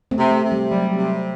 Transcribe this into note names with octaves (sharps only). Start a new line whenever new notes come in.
A3 C4
C3
A3
C3
G3
F#3 G3
C3